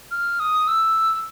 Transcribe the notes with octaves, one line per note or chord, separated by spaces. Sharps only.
F6
D#6
E6